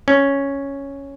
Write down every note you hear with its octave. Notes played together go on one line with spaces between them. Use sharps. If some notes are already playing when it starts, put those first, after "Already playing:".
C#4